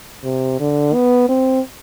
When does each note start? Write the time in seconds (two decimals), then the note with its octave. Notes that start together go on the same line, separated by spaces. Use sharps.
0.24 C3
0.60 D3
0.94 B3
1.29 C4